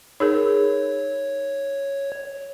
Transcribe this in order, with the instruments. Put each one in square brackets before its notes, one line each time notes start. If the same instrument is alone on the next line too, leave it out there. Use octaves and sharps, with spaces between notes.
[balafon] D#4 G#4 A#4 [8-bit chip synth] C#5